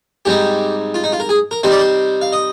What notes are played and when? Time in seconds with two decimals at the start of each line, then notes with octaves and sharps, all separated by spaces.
0.25 G#2 G3 C4 D#4 G4
0.94 F4
1.04 D#4
1.12 F4
1.20 A#4
1.29 G#4
1.51 A#4
1.63 C3 G3 C4 D#4 C5
1.71 D5
1.79 C5
2.21 F5
2.33 D#5